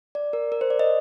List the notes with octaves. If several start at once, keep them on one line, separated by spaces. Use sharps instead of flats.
D5
A#4
A#4
C5
D5
D#5